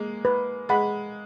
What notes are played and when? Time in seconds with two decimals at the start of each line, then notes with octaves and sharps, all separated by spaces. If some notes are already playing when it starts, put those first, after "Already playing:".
Already playing: G#3 A#3
0.25 B4
0.69 G#3 F#5 B5